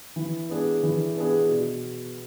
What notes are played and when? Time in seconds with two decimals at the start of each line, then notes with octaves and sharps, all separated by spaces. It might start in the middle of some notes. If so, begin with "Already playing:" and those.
0.16 E3
0.49 B3 D4 G#4
0.83 E3
1.16 B3 D4 G#4
1.49 B2